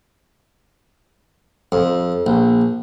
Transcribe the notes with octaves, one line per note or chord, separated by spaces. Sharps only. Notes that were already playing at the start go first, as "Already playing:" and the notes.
F2
A#1